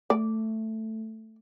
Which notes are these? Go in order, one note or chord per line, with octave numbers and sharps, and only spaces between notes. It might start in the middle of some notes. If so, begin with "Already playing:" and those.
A3 D5